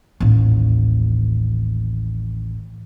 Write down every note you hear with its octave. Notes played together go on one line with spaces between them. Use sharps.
A1 D#2